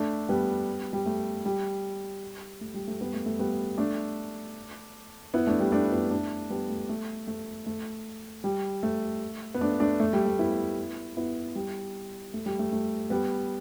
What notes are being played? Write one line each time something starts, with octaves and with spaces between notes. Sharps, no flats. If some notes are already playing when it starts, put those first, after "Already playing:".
Already playing: A3 D4
G3 B3
G3
A3
G3
A3
G3
A3
G3 B3
A3
A3
G3 B3
A3 D4
B3 E4
A3 D4
G3 B3
A3 D4
B3 E4
A3 D4
G3 B3
A3
A3
A3
A3
G3
A3
B3
A3 D4
A3 D4
A3
G3
A3
B3 E4
B3 E4
G3
A3
G3
A3
A3
G3 B3